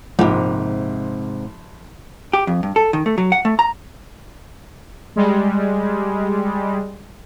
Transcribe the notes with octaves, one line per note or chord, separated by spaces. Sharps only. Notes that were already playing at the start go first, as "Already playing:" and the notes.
A#1 G#2 C3
G4
F2
G2
A4
D#3
A3
F#3
F#5
A3
A#5
G3 G#3